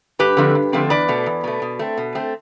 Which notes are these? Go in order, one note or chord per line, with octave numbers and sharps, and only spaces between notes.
G2 G4 B4
D3 F3 A3 C4
G2
D3 F3 A3 C4
E2 B4 D5
B2 A3
E2
B2 A3
B2
A3 C4
B2
A3 C4